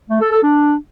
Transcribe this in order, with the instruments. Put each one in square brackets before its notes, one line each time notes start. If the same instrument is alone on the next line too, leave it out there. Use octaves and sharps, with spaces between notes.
[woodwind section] A3
A4
A4
D4